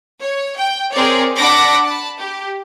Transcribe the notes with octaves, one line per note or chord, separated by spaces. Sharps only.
C#5
G5
C4 G#4 A#4 C#5 D5
D4 F#5 A5 B5 D6 A#6
A5 B5
G4